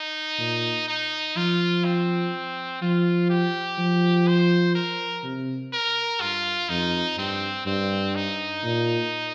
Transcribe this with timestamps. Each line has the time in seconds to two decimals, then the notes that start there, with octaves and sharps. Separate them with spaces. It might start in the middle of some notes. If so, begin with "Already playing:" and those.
Already playing: D#4
0.39 A#2
0.88 D#4
1.36 F3 F4
1.85 C4
2.82 F3 F4
3.30 G4
3.78 F3
4.28 C5
4.75 A#4
5.23 C3
5.73 A#4
6.21 G2 F4
6.69 F2 D#4
7.18 G2 C4
7.66 G2 C4
8.15 D#4
8.64 A#2